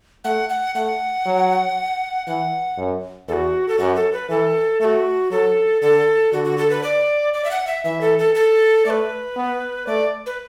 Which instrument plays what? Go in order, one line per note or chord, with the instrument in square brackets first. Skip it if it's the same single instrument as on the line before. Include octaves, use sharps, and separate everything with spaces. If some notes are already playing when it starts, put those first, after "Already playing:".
[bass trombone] A3 [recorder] F#5
[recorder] F#5
[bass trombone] A3 [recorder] F#5
[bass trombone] F#3
[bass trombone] E3 [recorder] F#5
[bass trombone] F#2
[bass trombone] E2 [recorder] A4
[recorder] F#4
A4
[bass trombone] F#2 [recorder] F#4
[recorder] A4
B4
[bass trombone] E3 [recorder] A4
[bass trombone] A3 [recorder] A4
[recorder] F#4
[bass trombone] F#3 [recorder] A4
[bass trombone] D3 [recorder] A4
[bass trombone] D3 [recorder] F#4
[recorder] F#4
A4
B4
D5
D5
E5
F#5
E5
[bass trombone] E3 [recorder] E5
[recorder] A4
A4
A4
[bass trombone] A3 [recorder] B4 D5
[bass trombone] B3
[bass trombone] A3 [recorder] D5
[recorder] B4